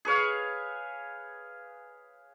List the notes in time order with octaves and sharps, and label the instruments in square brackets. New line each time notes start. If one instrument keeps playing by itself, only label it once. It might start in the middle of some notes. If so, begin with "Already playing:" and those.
[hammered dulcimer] G#4 B4 C#5 F5